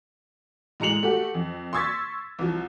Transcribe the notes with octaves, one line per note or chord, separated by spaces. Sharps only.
A2 G#3 A#5 C#7 F7 F#7
A3 F#4 G4
F2
C6 C#6 E6 G#6 A6 B6
C2 F3